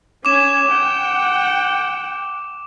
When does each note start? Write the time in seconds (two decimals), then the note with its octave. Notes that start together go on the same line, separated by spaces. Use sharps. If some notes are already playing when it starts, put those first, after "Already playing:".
0.25 C#4 G#5 D6 E7
0.68 F#5 G5